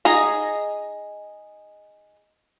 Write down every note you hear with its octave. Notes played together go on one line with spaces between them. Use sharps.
D#4 G#4 D#5 A#5